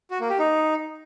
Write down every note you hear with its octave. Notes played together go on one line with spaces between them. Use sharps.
F#4
A#3
G4
D#4